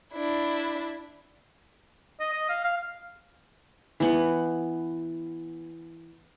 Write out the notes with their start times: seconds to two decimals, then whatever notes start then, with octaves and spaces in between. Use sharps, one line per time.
0.14 D4 E4
2.20 D#5
2.33 D#5
2.49 F5
2.65 F5
4.00 E3 B3 F#5